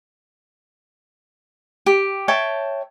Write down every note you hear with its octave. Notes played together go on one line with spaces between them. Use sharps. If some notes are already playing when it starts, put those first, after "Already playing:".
G4
C#5 E5 G5 A5